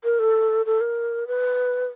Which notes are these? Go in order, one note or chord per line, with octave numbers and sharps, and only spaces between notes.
A#4
A4
A4
A#4
B4